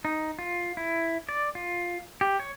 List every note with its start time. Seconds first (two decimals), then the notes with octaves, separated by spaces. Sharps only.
0.05 D#4
0.39 F4
0.77 E4
1.29 D5
1.55 F4
2.21 G4
2.40 C#5